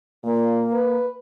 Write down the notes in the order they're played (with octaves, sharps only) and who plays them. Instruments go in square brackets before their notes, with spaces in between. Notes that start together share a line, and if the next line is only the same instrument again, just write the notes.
[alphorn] A#2 [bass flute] A#3
[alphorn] B4